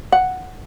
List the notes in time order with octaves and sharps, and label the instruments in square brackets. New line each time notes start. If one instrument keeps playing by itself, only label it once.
[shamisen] F#5